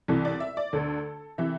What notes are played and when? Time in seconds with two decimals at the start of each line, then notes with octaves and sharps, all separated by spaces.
0.08 C2 C3 E3 A4
0.25 D5
0.40 E5
0.57 D5
0.73 D2 D3 A4
1.38 C3 E3 E5